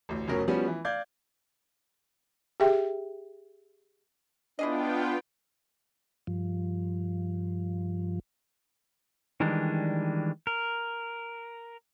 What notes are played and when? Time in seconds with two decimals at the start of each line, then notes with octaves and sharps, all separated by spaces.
0.09 A1 D2
0.28 F1 B2 C#4 A#4 C#5
0.48 F3 G3 B3 C#4 F#4
0.67 E3
0.85 D5 F5 G6 G#6
2.60 G4 G#4 E5 G5
4.59 B3 D4 E4 F4 G#4 D#5 G5
6.27 G2 F3
9.40 D#3 E3 G3 G#3 D4
10.47 A#4